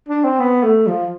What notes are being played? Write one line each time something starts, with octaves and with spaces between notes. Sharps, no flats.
D4
C4
B3
A3
F3